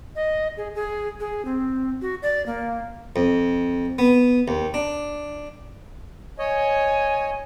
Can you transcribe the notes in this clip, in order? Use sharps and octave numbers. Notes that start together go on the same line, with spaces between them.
D#5
G#4
G#4
G#4
C4
F#4
D5
A#3
F2
B3
D#2
D4
C#5 D#5 G#5